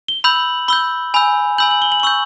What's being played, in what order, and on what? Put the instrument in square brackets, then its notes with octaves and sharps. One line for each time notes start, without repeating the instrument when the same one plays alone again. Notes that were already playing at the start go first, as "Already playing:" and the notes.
[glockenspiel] G7
B5 E6 G6 F#7
B5 E6 G6 G7
G#5 B5 E6 G6
G#5 B5 E6 G6 F#7
F#7
G7
F#7
G7
C#6 E6 G6 F#7